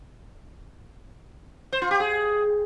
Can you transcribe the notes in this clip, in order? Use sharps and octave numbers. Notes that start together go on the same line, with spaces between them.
C5
F4
G4
G#4